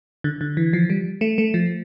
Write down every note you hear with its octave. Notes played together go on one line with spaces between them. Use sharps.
D3
D3
E3
F3
G3
A3
A3
F3